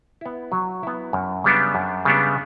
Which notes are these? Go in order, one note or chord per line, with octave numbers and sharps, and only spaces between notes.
B3 E4
F#3
B3 E4
F#2
C#3 G3 B3 D4
F#2
C#3 G3 B3 D4